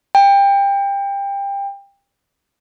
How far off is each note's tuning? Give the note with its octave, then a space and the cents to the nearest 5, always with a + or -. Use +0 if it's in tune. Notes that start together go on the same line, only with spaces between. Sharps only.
G5 +25